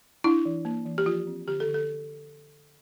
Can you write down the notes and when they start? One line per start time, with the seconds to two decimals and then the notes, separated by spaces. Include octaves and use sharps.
0.24 D4 E4
0.45 E3
0.65 A#3
0.86 E3
0.98 G4
1.06 F3 F4
1.27 C4
1.47 D3 G4
1.60 A4
1.67 D3
1.74 A4